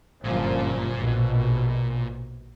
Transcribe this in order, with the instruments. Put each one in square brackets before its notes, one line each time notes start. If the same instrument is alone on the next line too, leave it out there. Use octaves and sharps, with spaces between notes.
[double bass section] G1 F#2 F3 [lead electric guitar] A#2
[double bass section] A#1 B2